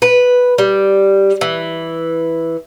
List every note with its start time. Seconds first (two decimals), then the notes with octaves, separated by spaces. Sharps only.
0.02 B4
0.58 G3
1.41 E3